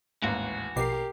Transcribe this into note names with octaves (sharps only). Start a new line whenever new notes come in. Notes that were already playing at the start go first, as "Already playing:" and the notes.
A1 D#2 G#2 E3 F#4
A#1 B2 G4 A#4 D6 C7